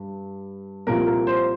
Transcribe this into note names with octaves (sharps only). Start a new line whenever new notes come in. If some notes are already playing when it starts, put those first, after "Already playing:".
Already playing: G2
C2 A#2 F3 A#4
A#4
C5